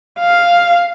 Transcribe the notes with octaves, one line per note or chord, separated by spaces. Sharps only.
F5